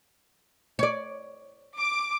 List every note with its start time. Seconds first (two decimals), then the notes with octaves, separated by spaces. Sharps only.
0.79 C#5 D5
1.78 D6